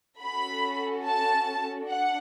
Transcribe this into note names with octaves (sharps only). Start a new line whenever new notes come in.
C#4 F#4 A4 B5
A5
D4 F#5